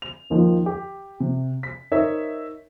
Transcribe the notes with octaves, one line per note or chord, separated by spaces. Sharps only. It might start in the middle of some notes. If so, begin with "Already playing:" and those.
F7
D#2 D#3 F3
G4
C3
B6
D#4 A#4 C5 C#5 E5